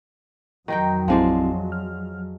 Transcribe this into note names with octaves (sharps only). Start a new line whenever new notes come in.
F2 D#3 F#3 D#4 G5
A1 F3 G#3 C4 E4 D5
F6